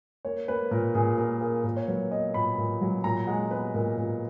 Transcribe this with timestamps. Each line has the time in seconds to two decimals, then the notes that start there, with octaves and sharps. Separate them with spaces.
0.25 A#3 C#5
0.48 A#3 B4
0.71 A#2 A#4
0.95 A#2 G#4
1.17 A#3 A#4
1.41 A#3 G#4
1.64 A#2 A#4
1.76 C#5
1.88 F#3 B4
2.11 B3 D#5
2.34 A#2 B5
2.58 A#2
2.81 F#3
3.04 A#2 A#5
3.27 G#3 F#5
3.51 B3 B4
3.74 A#2 A#4
3.97 A#2 A#4